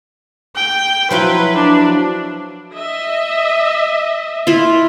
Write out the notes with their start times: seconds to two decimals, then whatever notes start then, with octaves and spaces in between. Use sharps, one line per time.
0.55 G5
1.11 F3 F#3 E4 B4
1.56 D4
2.75 D#5 E5
4.47 E4 F4